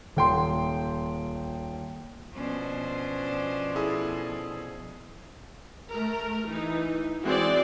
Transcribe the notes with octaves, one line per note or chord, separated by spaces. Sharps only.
D#1 G5 C6
B2 F3 C#4 D4 C5
E4 G#4 A4
A3 A#4
E3 D#4
E3 G#3 C4 F#4 D5